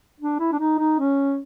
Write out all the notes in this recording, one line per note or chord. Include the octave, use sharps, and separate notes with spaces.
D4
E4
D4
D#4
D#4
C#4